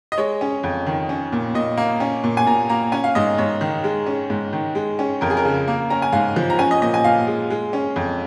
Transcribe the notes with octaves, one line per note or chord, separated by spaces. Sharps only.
D#5
G#3 C#5
C#4
F2
D#3
C#4
A#2
A#2 D#5
A#3
C#4
A#2
G#5
A#2 A#5
A#3 A#5
C#4 G#5
F5
G#2 D#5
G#2 C#5
D#3
G#3
C#4
G#2
D#3
G#3
C#4
F2 A#4
G#4
A#4
C#3
A#3
C#4 A#5
G#5
G#2 F5
F3
A#5
C#4 G#5
D#5
A#2 D#5
G#5
A#2 F5
G#3
G#3
C#4
F2